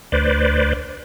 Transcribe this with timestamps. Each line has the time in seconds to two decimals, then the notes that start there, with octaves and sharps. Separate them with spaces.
0.12 D2 B4 C5 D5